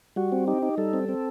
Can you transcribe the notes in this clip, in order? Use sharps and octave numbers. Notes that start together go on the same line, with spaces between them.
G3 F#4
C4
D#4 G4
D#4
G3 A4
C4
C4